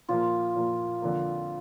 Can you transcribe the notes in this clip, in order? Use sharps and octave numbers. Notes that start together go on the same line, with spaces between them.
A#2 F3 A#3 F4
A#2 F3 A#3
F2 D3 F3 A#3